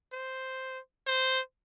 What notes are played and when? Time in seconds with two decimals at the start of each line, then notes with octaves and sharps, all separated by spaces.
0.13 C5
1.07 C5